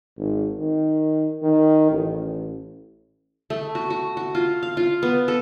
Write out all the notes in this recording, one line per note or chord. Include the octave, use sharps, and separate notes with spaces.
G#1
D#3
D#3
A1
A3
F#4
F#4
F#4
F4
F5
F4
B3
A4